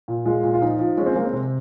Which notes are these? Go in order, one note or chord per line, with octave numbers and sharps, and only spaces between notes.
A#2
G#3 F4
A#2
F4
F3 D#4
F3
G#3 C#4
C4
G#3 A#3
C4
C3